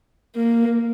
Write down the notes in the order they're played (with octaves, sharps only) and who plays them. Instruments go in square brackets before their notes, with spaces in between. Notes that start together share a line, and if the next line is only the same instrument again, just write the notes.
[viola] A#3